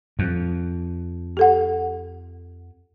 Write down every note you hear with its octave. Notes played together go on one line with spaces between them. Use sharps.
F2
G4 A4 F#5